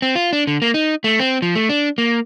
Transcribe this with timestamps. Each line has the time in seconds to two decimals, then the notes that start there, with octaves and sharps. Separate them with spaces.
0.02 C4
0.16 F4
0.33 D4
0.47 D3
0.62 A#3
0.74 D#4
1.04 A3
1.20 C4
1.42 F3
1.55 A3
1.69 D4
1.98 A#3